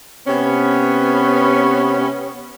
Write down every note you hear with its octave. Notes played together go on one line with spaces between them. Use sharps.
C3 B3 C#4